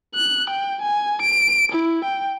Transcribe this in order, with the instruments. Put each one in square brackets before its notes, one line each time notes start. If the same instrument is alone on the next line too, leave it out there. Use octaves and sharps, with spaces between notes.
[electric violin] F#6
G5
G#5
D7
E4
G5